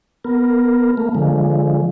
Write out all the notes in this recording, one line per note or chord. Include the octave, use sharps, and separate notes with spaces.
B3 A#4
A3 A#3
D3 F3 G#3